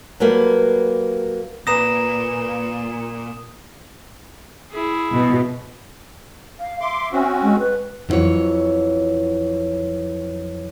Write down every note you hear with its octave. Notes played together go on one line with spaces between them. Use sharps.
F#3 G3 A3 A#3 B4
A#2 B4 A#5 D#6 A#6 E7
E4 G#4
B2
F5
E5 C6 D6
C4 C#4 F#4
G#3
B4
F2 D3 E3 F#3 C#5